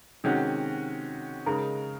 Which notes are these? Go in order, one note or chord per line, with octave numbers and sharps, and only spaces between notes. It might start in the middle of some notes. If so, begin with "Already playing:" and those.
C3 D#3 G#3 C#4 F#4
C#3 G#3 D#4 A#4